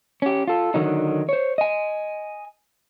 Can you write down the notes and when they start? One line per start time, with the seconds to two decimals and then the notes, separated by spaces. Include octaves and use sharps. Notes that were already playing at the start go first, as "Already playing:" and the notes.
0.22 C#4 G4
0.48 F4 A4
0.74 D3 D#3 F#3 D#4
1.29 C5 C#5
1.58 D#5 G#5